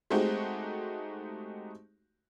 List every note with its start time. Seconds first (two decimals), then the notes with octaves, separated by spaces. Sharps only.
0.10 G#3 A3 C4 D#4 F#4 G4